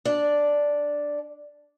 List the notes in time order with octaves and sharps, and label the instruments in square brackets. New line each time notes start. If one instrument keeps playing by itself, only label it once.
[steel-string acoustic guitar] D4 D5